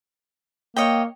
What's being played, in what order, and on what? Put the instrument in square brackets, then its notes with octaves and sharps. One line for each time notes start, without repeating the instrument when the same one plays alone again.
[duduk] A#3 [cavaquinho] C#5 D#5 G5